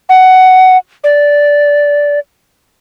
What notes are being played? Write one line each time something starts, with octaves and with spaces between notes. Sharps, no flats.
F#5
D5